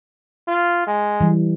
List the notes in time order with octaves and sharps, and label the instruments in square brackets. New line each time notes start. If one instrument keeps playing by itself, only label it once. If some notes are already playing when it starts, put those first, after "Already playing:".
[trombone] F4
G#3
[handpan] E3 G3